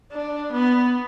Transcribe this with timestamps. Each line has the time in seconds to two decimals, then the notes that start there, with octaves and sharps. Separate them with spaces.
0.12 D4
0.52 B3